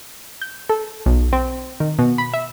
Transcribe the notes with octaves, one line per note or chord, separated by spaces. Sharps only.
G6
A4
B1
C4
D#3
B2
B5
E5